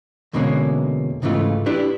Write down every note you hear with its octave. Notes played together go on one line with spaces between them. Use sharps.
E2 B2 D3 G#3 A#3 C#4
C#2 G#2 C#3 E3 A3 F4
D4 E4 G4 B4